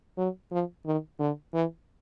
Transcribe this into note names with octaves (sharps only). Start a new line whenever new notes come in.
F#3
F3
D#3
D3
E3